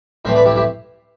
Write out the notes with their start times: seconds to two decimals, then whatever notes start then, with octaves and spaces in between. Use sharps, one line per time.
0.25 A2 E3 A3 C4 C5 E5
0.35 B4 D5
0.46 E4 G4
0.56 E4 G4